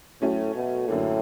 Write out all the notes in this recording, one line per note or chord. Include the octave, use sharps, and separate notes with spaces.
A2 F#3 A3 C#4
B2
F#2 A2 D3 F#3 A#3